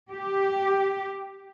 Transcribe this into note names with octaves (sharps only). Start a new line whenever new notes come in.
G4